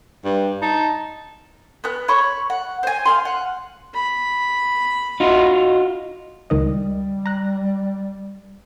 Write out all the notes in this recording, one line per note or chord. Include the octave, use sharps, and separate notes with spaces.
G2
D#4 A5
B3 F#6
C#5 B5 C#6
F#5
C5 G#5
F5 G#5 C6
F#5
B5
D#4 F4 F#4
C#2 D#3 G3 D#5
A#5 F#6